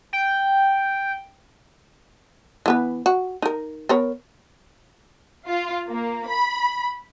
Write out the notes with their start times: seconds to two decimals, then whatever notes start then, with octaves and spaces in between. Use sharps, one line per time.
0.13 G5
2.66 E3 B3 B4
3.06 F#4
3.42 D#4 A#4
3.89 B3 A#4 C#5
5.47 F4
5.88 A#3
6.28 B5